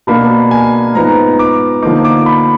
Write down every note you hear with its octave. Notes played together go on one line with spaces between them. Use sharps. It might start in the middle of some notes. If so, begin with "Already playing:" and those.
B2 A#3 D4 B5
G#5
G#2 F3 B3 D#4 A#5
D6
D3 F3 A#3 D#4 D6
D6
B5